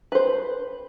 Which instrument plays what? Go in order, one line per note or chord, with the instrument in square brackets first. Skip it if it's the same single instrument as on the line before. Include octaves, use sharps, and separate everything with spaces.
[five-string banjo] B4 C5